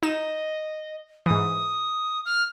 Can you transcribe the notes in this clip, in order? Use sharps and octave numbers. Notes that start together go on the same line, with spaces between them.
D#4 D#5 E7
G#2 E3 D#6
F6